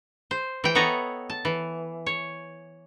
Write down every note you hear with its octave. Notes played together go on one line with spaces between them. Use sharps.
C5
E3 G5
B3 A4 C#5 D#5 A#5
A5
E3
C#5